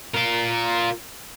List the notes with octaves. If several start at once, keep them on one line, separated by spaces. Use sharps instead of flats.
F4 A#4